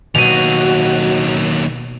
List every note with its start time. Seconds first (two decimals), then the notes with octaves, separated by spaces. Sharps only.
0.15 D#2 B2 F#3 F#4 D#7 F7